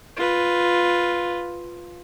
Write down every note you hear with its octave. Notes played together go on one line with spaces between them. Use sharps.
F4 B4